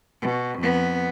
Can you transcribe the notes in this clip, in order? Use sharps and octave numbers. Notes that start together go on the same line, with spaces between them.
B2
F2 B3